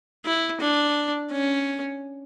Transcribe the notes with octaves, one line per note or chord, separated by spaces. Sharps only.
E4
D4
C#4